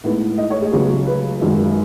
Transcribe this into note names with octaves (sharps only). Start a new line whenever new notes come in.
A2 G#3 B3 D#4
D#5
C#5
G#4
C#2 C#3 F#3 B3 G#4
B4
G#1 F#2 D#3 G#3